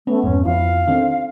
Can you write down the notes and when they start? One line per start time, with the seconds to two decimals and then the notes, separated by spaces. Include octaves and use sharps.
0.07 A3 B3 C#4
0.24 F2 G#2 C#4
0.45 F2 F3 E4 F5
0.88 D#3 A3 C4 D4